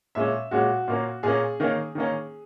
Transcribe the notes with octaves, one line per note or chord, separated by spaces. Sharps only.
A#2 G#3 C#4 E5
A#2 G#3 C#4 F#4
A#2 A#3 C#4
A#2 A#3 C#4 G#4
D#3 A#3 C#4
D#3 A#3 C#4